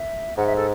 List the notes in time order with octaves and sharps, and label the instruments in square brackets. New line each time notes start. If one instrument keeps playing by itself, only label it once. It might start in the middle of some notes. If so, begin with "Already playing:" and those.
Already playing: [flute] E5
[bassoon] G#2 [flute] F#5
[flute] E5
A4